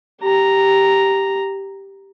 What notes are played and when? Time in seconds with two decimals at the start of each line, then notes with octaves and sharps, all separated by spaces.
0.21 G4 A#5